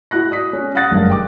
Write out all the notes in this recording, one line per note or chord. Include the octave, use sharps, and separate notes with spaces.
E4 F#4 F#6 A#6
D5 D#6 B6
C#4
F5 F#5 D#6 F#6 A6 A#6
F#1 G2 F5
G5 D6